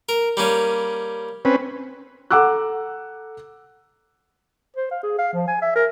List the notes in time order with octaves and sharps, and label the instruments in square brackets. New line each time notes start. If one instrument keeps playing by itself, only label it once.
[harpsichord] A#4
G3 A#3 C#4
[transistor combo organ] C4 C#4 B4
[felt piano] A4 F#5 A#5 D6 E6 F#6
[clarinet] C5
F5
G#4
F5
F3
G#5
E5
A#4